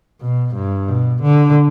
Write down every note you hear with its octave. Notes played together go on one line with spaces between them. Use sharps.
B2
G2
B2
D3